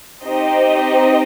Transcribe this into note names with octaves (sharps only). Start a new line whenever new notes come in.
C4 D#4 G4 C5 D#5